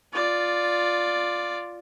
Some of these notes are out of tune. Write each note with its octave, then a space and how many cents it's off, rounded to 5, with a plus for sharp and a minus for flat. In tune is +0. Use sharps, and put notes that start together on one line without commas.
F4 +0 D5 +0